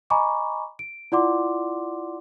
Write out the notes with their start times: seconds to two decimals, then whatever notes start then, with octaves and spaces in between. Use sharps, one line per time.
0.10 D#5 G#5 A#5 B5 C#6 D6
0.79 D7
1.12 E4 F4 D5 F#5 C6 D6